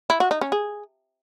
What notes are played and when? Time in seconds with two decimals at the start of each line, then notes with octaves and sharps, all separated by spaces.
0.10 E4
0.20 F#4
0.31 D#4
0.41 C#4
0.52 G#4